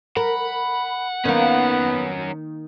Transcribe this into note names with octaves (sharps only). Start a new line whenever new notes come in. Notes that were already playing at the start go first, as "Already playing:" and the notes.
A#4 F#5 B5
D#3 A#3 B3 C#4 A#4